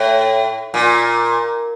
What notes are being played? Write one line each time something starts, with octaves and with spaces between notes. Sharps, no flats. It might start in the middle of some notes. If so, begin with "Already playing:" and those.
Already playing: A2
A#2